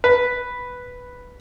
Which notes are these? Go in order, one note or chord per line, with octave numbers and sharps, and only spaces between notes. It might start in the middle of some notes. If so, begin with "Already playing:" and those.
B4